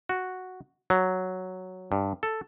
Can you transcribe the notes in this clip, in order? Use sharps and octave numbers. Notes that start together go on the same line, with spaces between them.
F#4
F#3
G2
A4